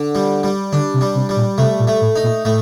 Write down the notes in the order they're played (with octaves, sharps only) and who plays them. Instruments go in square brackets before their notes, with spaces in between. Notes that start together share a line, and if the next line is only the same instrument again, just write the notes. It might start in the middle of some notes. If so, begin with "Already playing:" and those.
Already playing: [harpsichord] D3
G3
G3
[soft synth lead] D3 [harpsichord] D4
[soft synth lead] C3
[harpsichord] G3
[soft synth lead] C3
[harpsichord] G3
[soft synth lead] A#2
[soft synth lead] C3 [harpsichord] A3
[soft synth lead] A#2
[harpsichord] A3
[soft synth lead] A2
[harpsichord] D#4
[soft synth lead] A#2
[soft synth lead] A2 [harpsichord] A3